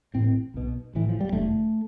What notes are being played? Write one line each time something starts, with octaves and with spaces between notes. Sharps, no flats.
A1 A2 C4
B1 B2
A1 A2 E3
F3
G3
E1 E2 D3 A3